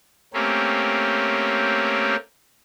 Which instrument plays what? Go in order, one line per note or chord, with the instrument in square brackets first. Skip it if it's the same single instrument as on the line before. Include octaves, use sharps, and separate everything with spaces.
[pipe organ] A3 A#3 C4 C#4 G4